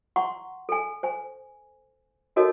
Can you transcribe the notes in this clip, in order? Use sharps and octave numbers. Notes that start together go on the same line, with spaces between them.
F#5 A#5 C6 C#6
A4 G#5
C5 G#5
D#4 F#4 A4 A#4 C#5 D#5